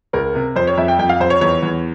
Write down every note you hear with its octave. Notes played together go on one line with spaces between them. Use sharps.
C#2 A#4
C3
F2 C5
C#5
F2 E5
G5
F2 G5
F5
F2 C5
C#5
E2 C#5
E2